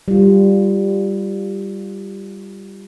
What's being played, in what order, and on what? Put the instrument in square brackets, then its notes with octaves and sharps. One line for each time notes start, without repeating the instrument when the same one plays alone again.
[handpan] G3 F4